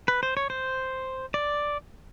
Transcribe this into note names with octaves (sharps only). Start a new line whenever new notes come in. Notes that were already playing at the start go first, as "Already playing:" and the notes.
B4
C5
C#5
C5
D5